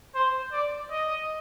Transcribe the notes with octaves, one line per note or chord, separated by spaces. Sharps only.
C5
D5
D#5